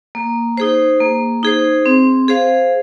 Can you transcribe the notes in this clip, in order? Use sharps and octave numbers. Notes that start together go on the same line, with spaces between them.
A#3
D#4 G#4 C5
A#3
D#4 G#4 C5
C4
G#4 C5 F5